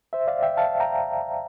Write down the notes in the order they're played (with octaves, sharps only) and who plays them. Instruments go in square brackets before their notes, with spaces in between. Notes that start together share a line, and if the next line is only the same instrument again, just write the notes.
[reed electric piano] C5 E5
D5 F5
E5 G5
F5 A5
G5 A#5